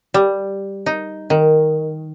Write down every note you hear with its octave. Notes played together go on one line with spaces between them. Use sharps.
G3
D#4
D#3